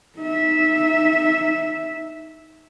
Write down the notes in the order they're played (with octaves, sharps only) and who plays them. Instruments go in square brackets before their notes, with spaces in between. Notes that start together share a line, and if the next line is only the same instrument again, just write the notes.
[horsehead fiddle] D#4 E5